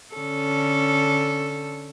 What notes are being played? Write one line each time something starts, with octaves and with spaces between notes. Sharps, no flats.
D3 C#4 A4